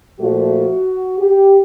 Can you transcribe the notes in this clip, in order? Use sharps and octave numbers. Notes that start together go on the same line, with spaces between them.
A#2 F3 A3 F#4
G4